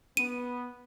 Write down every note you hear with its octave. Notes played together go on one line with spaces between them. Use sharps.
B3 D#7